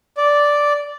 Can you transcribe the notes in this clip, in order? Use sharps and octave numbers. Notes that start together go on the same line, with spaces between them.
D5